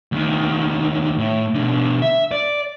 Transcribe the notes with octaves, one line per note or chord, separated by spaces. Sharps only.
D2 D#3
A2
B2 D3
E5
D5